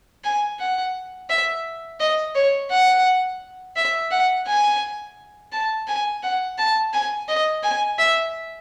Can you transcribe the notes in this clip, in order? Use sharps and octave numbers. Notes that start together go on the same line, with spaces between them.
G#5
F#5
E5
D#5
C#5
F#5
E5
F#5
G#5
A5
G#5
F#5
A5
G#5
D#5
G#5
E5